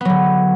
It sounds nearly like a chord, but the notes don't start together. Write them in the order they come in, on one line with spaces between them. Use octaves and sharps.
B3 F#3 D3